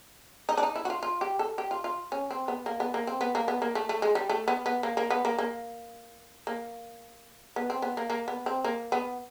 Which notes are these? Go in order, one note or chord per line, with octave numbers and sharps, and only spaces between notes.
D#4
D4
D#4
E4
F#4
F4
F4
G4
A4
G4
F4
F4
C#4
C4
B3
A#3
B3
A#3
C4
B3
A#3
B3
A#3
A3
A3
G#3
G3
A3
B3
B3
A#3
A#3
B3
A#3
A#3
A#3
B3
C4
B3
A#3
A#3
B3
C4
A#3
B3